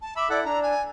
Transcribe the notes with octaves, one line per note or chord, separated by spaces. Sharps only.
A5
E5 B5 D6 E6
E4 A4 D5 F#5
D4 A#5
G#5